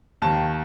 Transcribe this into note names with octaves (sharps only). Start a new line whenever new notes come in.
D#2 D#3 A5